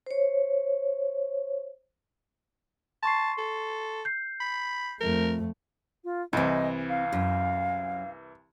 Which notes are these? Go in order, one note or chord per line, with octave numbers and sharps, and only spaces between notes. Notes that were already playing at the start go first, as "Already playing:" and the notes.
C5 C#5
A5 C6 C#6 C7
A4
G6 C7
B5
F2 A3 A#4
F4
C2 E3 C4 E4 D#5
F5
F#2